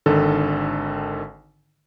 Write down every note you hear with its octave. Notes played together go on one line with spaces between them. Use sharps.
G#1 D3 D#3 A4